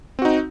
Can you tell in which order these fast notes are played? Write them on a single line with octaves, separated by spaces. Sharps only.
C4 F#4 D#4